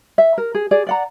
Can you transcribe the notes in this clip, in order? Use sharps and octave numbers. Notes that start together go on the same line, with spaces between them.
E5
A#4
G#4
G#4 D5
D5 F#5 A#5